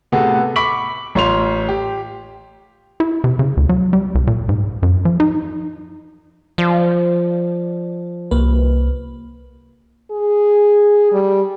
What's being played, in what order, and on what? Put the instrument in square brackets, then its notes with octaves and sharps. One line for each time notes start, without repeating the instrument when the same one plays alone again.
[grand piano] A2 C3 B3 F#4 G#4 A4
B5 C#6 D6 B6 D7 F#7
A1 F4 C#5 C6 F7
G4
[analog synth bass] E4
C3
C#3
D2
F#3
G3
C2
A#2
G#2
F#2
F3
D#4
[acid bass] F3 [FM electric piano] D5
[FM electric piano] C2 A#3 B4
[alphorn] G#4
G3